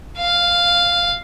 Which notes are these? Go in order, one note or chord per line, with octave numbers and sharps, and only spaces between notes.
F5